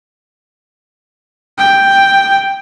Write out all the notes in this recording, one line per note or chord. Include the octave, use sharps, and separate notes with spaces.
G5